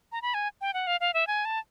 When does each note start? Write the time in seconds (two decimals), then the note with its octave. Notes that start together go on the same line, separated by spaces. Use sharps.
0.12 A#5
0.22 B5
0.34 G#5
0.61 G5
0.74 F#5
0.87 F5
1.00 F5
1.14 E5
1.27 G#5
1.45 A5